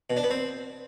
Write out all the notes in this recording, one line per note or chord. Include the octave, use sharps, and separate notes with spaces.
B2
D4
B3
C4